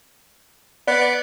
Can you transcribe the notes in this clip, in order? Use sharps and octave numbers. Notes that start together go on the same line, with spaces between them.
B3 D5